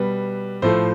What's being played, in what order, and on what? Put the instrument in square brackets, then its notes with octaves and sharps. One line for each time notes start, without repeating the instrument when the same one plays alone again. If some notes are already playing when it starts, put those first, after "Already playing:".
Already playing: [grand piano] B2 G3 B4
A2 F3 A3 C5